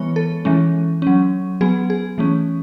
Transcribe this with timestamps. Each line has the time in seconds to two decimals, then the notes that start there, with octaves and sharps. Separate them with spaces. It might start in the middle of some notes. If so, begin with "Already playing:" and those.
Already playing: E3 G#3 B3 C#5
0.16 A4
0.45 E3 G#3 C#4
1.02 F#3 C#4
1.61 F#3 B3 G#4
1.90 G#4
2.18 E3 A3 C#4